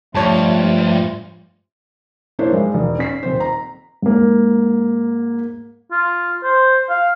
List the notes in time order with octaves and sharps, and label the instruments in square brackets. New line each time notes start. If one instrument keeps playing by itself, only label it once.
[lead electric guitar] G2 [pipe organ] F3 A3 F4 [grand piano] C#5 A5
[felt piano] A#3 D4 E4 C5 C#5
G2 G3 G#3
E1
C#4 B6 C7
D#1 C4 C5
A#5
[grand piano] G#2 A#3
[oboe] F4
C5
F5